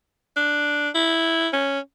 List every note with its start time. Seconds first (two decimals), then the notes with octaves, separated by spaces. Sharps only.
0.37 D4
0.95 E4
1.53 C#4